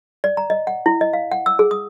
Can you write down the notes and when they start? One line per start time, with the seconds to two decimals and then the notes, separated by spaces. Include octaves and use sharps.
0.24 D5
0.37 A#5
0.50 D#5
0.67 F#5
0.86 E4
1.01 D#5
1.13 F5
1.32 F#5
1.46 E6
1.59 G#4
1.71 D#6